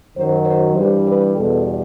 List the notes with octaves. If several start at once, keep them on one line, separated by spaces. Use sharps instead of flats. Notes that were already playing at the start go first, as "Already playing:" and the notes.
F#2 D#3 F#3 C5
C5
G2 E3 G3 C5
B4
E2 B2 G3 A4